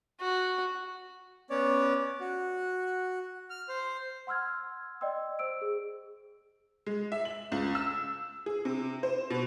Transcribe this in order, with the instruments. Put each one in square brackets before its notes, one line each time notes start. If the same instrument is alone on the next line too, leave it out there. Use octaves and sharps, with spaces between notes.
[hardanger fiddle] F#4
[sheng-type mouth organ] B3 C#4 C#5 D5
F#4
F6
C5
[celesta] F#5 C6 E6 F6 G#6
D5 D#5 G5 C6 E6
C5 E6 D7
G#4
[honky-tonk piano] G#3
E5
F#7
C#2
E6
G#4
C3
C5
B2